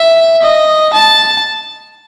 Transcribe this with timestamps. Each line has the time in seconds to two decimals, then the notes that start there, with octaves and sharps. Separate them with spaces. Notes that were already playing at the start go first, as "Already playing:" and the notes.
Already playing: E5
0.42 D#5
0.93 A5